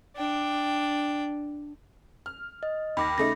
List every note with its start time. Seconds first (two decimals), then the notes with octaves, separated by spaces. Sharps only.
0.17 D4 G5
2.26 F6
2.63 D#5
2.97 D#2 B5 D6 A#6
3.18 C#3 A3 D#4 A#6